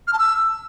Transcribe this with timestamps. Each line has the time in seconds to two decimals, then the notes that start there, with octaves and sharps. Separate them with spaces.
0.07 F6
0.13 A5
0.19 E6